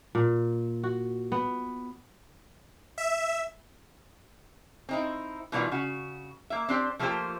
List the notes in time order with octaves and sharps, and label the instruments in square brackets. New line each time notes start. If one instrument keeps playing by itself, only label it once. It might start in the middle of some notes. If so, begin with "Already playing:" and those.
[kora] A#2
F#4
B3
[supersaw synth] E5
[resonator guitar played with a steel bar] C4 D#4 E4
B2 D#3 E3 G3 B3 F4
C#3 F#4
A#3 E5
C4 D4 G4 C5
F3 A3 A#3 F4 G4 C5